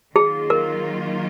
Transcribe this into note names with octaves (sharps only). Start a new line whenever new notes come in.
D#3 F#3 A#3 F4 G#4
A#4